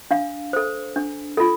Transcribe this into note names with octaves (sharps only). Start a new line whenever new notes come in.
D4 F5
A4 C5
D4
F4 A4